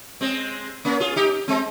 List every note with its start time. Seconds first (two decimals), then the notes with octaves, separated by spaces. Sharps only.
0.21 G#3 C4
0.85 A#3 C#4
1.00 F4 G#4
1.16 D#4 G4
1.48 G#3 C4